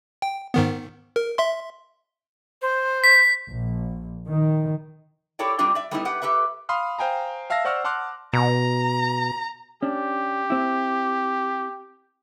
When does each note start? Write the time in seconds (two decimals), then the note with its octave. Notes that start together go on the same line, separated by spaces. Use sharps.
0.22 G5
0.54 G#2 D#3 B3
1.16 A#4
1.38 E5 C6
2.62 C5
3.04 B6
3.48 A#1
4.28 D#3
5.39 E4 G4 A4 C#5 D5 G5
5.59 G3 A3 C4 D4 F4 G4
5.75 D5 E5
5.91 G3 A3 B3 C#4 D#4 E4
6.05 G4 B4 F#5
6.22 G4 A4 B4 E5
6.69 F5 B5 C6 D#6 F6
6.99 C5 F5 G5 G#5 A#5
7.50 E5 F5 A5 E6 A#6
7.65 C5 D5 F#5 C#6 E6 F6
7.84 F#5 A5 C6 D6 F6 F#6
8.33 B2 A#5
9.83 C#4 D4 G4
10.50 C4 E4